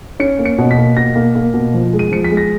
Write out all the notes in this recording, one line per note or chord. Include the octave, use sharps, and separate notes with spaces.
C#4 C#7
A#3
C#7
B2
B6
A#3
B2 A#6
A#3
A#3
B2
F3
G#3
D#7
F3 C#7
B6
G#3
A#6